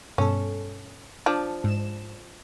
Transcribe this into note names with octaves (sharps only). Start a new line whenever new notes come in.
G2 B2 C#4 A4
F3 D4
G#2 E7